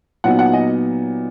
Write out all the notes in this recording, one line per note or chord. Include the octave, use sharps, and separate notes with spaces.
A#2 F#3 B3 D#4 F#5
F#5
D#5